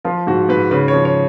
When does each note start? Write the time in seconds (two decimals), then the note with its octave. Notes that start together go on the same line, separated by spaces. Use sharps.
0.05 F3 F4
0.27 G#2 F#4
0.49 G#2 B4
0.71 C#3 B4
0.88 C#5
0.94 F3
1.05 C#5